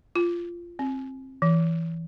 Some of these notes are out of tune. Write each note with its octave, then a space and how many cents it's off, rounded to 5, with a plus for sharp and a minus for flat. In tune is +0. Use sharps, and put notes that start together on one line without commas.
F4 -15
C4 +20
E3 +5